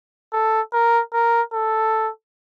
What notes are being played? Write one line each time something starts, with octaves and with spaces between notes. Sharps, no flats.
A4
A#4
A#4
A4